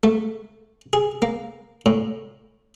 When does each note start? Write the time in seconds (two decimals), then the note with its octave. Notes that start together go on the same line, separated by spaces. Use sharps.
0.03 A3
0.93 G#4
1.22 A#3
1.86 A2